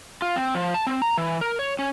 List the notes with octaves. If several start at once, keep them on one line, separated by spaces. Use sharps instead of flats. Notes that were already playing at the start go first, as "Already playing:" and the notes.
F4
C4
F3
A5
C4
A#5
E3
A#4
C#5
C#4